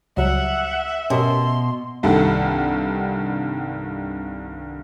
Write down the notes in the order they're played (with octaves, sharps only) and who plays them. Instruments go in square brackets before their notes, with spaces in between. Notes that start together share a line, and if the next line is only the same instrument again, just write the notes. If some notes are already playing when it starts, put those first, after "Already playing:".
[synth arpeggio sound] C#2 F#3 G3 [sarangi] E5 [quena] F#5
[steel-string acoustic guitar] B2 [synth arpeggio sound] C#4 G4 A#4 [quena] C6
[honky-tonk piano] C2 G2 D#3 G4 A4 F#5